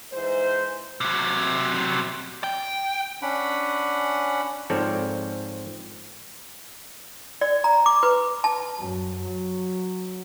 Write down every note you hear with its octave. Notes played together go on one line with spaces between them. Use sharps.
G#2 E3 C5
C3 F#3
G5
C#4 D4 F#5 B5
G#2 F3 C4 A4 C#5 D5
D5
A#5
D6
B4
A5
F#2
F#3